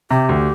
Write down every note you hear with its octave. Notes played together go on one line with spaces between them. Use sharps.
C3 G4
D2